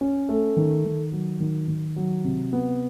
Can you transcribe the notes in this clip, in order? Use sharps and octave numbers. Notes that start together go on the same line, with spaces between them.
C#4
A3
D#3
D#3
F#3
D#3
D#3
F#3
C3
B3